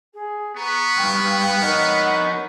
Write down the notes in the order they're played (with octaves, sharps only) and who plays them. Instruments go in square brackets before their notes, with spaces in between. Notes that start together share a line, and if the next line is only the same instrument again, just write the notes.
[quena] G#4
[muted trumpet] B3 [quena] A#5 [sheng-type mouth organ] C#6
[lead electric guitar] C#2 G2 [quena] G5
[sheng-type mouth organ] D#4 B5 [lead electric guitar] A#4 C#5 [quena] F#5